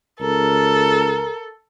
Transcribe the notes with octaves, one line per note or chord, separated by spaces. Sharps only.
C#2 A4 A#4